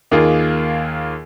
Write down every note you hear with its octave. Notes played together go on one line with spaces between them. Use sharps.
D#2 D#3 A#3 F4 G#4